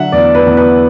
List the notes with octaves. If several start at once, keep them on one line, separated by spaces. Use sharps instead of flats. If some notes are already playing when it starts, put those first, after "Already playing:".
Already playing: D3 F#3 E5 F#5
E2 D5
B4
E2
B4